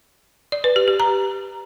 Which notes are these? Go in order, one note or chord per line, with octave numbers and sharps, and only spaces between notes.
D5
B4
G4
G4
A#5